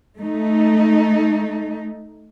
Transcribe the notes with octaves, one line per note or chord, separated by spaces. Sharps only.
A3 D#4